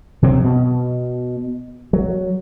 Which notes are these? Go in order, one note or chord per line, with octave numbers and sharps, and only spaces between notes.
C3 F#3 C4
B2
F#3